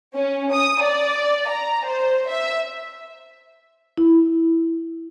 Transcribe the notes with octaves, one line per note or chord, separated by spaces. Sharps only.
C#4
D#6
D5
A#5
C5
E5
E4